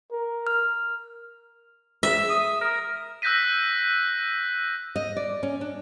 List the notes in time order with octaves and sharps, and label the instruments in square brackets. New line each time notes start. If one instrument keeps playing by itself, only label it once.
[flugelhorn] A#4
[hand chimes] F6
[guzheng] E5
[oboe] D#6
A#4
[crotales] E6 F#6 G6 A#6 B6 D#7
[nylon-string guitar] D#5
D5
C#4
D4